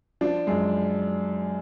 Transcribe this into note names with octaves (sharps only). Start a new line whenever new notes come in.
F3 D4
F#2 G#3